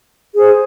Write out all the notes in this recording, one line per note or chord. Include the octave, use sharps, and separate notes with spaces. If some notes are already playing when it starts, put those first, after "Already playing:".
G#4 C5